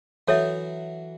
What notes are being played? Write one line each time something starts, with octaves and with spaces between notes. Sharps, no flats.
E3 F#3 A4 C#5 E5